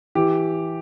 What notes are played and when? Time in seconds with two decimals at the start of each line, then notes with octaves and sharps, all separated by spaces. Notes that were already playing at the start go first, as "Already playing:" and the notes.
0.15 E3 G4